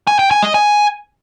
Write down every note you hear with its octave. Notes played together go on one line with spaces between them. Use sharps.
G#5
G5
G#5
D#5
G#5